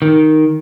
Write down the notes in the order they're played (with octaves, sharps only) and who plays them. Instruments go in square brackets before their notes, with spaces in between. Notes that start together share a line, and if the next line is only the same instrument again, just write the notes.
[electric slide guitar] D#3